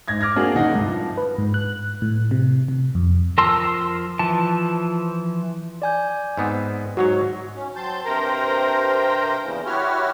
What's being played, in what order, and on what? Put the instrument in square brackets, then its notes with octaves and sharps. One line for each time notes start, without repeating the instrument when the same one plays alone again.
[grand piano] G#2 G#6 A#6
D6 F6 G#6 A#6
A#3 C4 D4 F#4 G#4
D1 C#3 D#4 F#5 A#6
G2 C3
F3
[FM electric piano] B4
G#2
F#6
A2
C3
C3
F2
[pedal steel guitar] F3 A#4 A5 C6 E6
E3 F3 A5
[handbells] D5 G#5 G6
[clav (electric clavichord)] G#2 B3 C4
[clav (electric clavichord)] G#2 F#3 C#5 [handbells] F#4
[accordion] C#4
F#3 C4 A5 C6 G6
G2 C3 A#4 C5 G5 A#5
E2 A#2 C#3 E3
E4 F#4 G4 C#5 F6